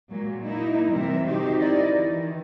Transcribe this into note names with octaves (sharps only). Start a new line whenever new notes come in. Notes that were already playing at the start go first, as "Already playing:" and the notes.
A#2 F#3 G#3 A#3
A#3 D#4 E4
C3 E3 G3 A#4 E5
D#3 C4 D#4 F#4 G4 C5
D#4 E4 A#4 D5 D#5
D#3 E3